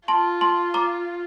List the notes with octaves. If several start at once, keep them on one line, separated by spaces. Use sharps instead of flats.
F4 A5 C6
A5 C6
A#5 D6